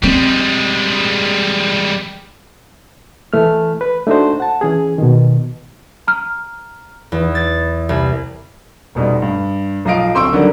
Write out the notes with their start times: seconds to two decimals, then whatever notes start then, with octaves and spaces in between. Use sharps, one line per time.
0.03 G3 G#3 C4
3.33 E3 A3 F6
3.81 B4
4.07 A3 D4 D#4 F#4 C5
4.40 F#5 A5
4.61 E3 C#4 G#4
4.98 B2 D#3
6.08 A#5 F6
7.12 E2
7.35 A6
7.89 C2
8.95 F1 B2 G3 D#4
9.22 G2
9.85 B1 F3 D#5 F5 D7
10.14 D1 C4 C6 C#6 E6 D7
10.33 D3 D#3 F#3 G3 C#4